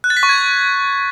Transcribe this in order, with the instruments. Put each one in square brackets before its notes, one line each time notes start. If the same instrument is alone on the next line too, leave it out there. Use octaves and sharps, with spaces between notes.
[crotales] F#6
A6
B6
C#6
G#6